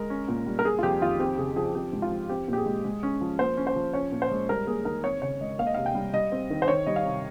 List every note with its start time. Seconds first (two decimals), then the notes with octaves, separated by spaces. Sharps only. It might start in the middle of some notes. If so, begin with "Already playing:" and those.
Already playing: G#3 A#4
0.10 C#4
0.28 A#2
0.46 G3
0.59 A#4
0.65 A#3 G#4
0.79 F4
0.83 F2 G4
1.01 D#3 F4
1.20 C4 G4
1.38 C#3 G#4
1.56 F3 G#4
1.75 C4 G4
1.93 G#2
2.02 F4
2.11 F3
2.29 C4 G4
2.48 A#2
2.53 G4
2.57 G#4
2.66 G#3
2.85 G#3
3.03 C#4
3.21 F3
3.39 A#3 C5
3.57 C#4
3.67 C5
3.76 F3
3.94 C#4 C#5
4.12 A#2
4.22 C5
4.31 G#3
4.49 G3 A#4
4.67 A#3 G#4
4.85 D#3 A#4
5.04 C4 C#5
5.22 C#3 C#5
5.40 G#3 D#5
5.59 A#3 F5
5.67 D#5
5.74 C3 F5
5.86 G5
5.95 G3
6.14 G3 D#5
6.32 C4
6.50 D#3
6.62 C5
6.68 D#3 C#5
6.86 G3 D#5
6.96 F5
7.05 C3